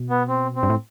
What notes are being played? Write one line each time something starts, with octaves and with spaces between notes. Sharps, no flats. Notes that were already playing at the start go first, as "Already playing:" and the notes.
Already playing: B2
B3
C4
C4
G2
A2